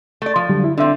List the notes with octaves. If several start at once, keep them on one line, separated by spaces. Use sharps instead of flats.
A3 D5
F3
D3 F#3 G3
E4
D3 C4 D4 E5